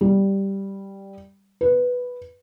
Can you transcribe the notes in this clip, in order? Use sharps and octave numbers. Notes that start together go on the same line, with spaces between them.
G3
B4